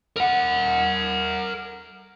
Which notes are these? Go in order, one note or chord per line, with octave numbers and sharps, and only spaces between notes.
A#4 F#5